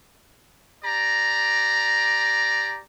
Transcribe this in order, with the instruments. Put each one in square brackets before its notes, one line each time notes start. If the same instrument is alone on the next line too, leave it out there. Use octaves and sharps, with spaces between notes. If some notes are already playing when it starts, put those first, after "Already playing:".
[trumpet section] G4 D5 A#5